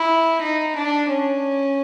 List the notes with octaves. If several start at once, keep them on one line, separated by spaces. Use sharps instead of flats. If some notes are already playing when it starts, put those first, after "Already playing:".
Already playing: E4
D#4
D4
C#4